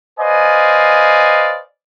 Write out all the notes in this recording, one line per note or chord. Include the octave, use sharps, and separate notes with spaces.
B4 C5 D5 D#5 F5 G#5